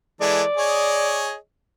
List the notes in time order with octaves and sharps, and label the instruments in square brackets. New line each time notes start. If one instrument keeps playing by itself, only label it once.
[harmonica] E3 G#3 A4 [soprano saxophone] D5
[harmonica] G#4 C#5 D#5